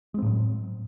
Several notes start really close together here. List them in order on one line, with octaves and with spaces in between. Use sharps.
G#3 C4 A2 F#3